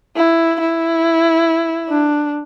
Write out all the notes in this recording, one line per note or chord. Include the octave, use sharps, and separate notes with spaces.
E4
E4
D4